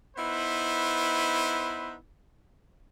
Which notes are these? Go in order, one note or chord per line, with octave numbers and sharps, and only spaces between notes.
B3 D#4 E4 B4 C5